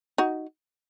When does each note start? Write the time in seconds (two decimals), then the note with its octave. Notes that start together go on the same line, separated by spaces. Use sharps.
0.18 D#4 F#4